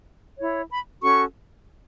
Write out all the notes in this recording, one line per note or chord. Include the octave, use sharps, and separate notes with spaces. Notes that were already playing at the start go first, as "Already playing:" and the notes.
E4 C#5
B5
C#4 F#4 A4 C#6